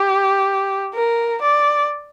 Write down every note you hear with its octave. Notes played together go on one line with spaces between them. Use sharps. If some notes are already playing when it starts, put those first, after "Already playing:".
Already playing: G4
A#4
D5